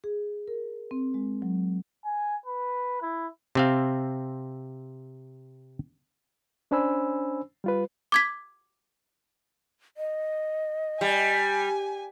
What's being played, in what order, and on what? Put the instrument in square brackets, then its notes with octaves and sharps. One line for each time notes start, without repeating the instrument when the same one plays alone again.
[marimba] G#4
A#4
C4
G#3
F#3
[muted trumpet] G#5
B4
E4
[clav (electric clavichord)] C3 C4 F5
[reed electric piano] C#4 D4 C5 G#5 B5 E6
G3 F4 B4
[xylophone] D6 G#6 B6
[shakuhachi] D#5
[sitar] G3 [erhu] G#5